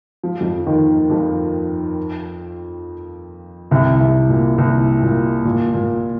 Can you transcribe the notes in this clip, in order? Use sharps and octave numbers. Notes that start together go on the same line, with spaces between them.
F3
F2 F3
D#2 D#3
F2 F3
C2 C3
C2 C3
A#2
C2 C3
A#2
A#2
A#2